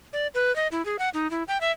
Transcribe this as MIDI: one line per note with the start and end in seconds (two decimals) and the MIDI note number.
0.13 0.27 74
0.34 0.54 71
0.56 0.68 75
0.72 0.84 64
0.85 0.97 68
0.99 1.09 78
1.14 1.30 63
1.31 1.43 64
1.48 1.60 79
1.61 1.71 76